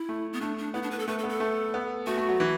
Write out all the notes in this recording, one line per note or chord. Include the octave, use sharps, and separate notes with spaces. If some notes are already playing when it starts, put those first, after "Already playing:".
Already playing: E4
A3
B3
A3 D4
D4
B3 E4
D4
B4
A4
A3 B4
A4
B3
A4
A3
B3
A3 F#4
A3
F#3
E3